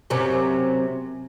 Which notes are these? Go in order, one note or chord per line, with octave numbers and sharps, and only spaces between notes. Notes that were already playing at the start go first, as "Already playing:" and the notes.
F#2 C3 F#3